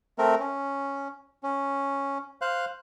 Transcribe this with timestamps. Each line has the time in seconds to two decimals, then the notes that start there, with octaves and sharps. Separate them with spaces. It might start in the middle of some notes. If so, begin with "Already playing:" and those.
0.18 A3 C4 A#4
0.40 C#4
1.43 C#4
2.42 C5 F5 F#6